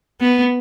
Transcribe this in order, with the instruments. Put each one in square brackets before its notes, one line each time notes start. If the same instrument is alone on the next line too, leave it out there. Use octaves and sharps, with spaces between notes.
[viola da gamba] B3